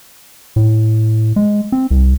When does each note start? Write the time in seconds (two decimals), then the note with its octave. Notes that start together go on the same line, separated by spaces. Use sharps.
0.56 A2
1.36 G#3
1.72 C4
1.91 C2